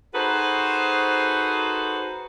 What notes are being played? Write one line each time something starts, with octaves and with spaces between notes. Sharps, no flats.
D#4 F#4 G#4 A4 B4 C5